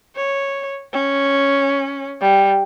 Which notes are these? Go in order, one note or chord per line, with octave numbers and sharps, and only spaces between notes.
C#5
C#4
G3